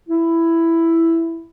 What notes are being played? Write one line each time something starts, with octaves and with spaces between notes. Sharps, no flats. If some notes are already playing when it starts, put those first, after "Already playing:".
E4